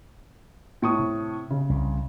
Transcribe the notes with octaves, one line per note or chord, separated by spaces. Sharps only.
A2 C#6 D#6
C3
C#3
C2